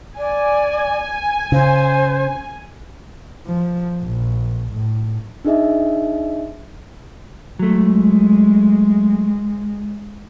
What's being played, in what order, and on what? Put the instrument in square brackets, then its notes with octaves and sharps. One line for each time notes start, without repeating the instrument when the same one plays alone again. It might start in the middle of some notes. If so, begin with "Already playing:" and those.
[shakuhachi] D5 [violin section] G#5
[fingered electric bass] C#3 [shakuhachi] C5
[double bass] F3
A#1
A2
[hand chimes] D4 D#4 G#4 D#5 E5
[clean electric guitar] F#3 A3 [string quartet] G#3